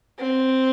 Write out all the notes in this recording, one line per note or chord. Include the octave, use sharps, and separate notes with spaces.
C4